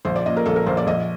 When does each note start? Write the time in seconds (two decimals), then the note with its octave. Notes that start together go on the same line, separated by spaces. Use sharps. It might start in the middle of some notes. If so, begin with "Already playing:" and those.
0.05 A#1 C5
0.16 D5
0.26 A#2 D#5
0.37 A#4
0.46 A#1 A4
0.56 A#4
0.66 A#1 C5
0.77 D5
0.86 A#1 D#5